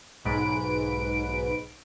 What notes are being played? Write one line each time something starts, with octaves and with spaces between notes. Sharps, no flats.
B1 G#2 B4 D7